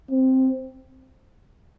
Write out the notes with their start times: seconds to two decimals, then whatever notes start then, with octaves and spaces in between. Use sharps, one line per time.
0.11 C4